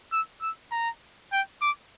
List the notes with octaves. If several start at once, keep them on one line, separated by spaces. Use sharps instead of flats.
E6
E6
A#5
G5
D6